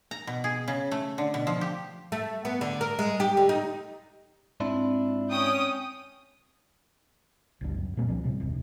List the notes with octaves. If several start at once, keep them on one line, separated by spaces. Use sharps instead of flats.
A#5
B2
G#4
C#3
A3
D3
B2
F3
G4
A3
B3
D3
A#4
G#3
G4
D3
D#4
G#2 C4 D4 E4
C#4 G5 D#6
G1 C#2 G2
F#2
A#2 G3 A#3 C4
C2 F3 C4 D4
A2 C3 G3
D1 G1 F2 C3